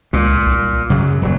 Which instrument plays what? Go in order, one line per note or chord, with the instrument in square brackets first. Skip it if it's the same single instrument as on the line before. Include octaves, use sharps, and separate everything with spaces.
[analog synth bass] C#2 [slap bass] A#2
[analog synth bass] C2
[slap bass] F#2 F#3 [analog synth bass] C#3
[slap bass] D#1 F#3